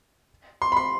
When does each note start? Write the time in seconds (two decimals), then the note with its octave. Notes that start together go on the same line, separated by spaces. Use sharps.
0.62 C6
0.72 B5
0.77 C6